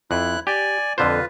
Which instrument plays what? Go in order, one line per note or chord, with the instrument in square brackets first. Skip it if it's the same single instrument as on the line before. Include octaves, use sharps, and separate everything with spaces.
[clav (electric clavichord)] F2 [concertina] E4 F#6
[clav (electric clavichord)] G4 [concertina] D5 G#5
[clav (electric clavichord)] F2 D3 C5 [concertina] F4 B4